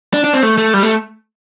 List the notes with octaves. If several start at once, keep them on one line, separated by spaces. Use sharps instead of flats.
D4
D4
C4
A3
A3
G3
A3